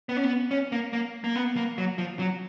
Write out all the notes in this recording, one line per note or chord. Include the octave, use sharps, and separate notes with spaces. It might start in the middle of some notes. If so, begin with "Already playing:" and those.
B3
C#4
B3
C#4
A#3
A#3
A#3
B3
A#3
F#3
F3
F#3